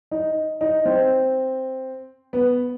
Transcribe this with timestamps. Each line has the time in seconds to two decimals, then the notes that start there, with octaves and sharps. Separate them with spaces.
0.11 D#4
0.61 D#4
0.85 C4
2.33 B3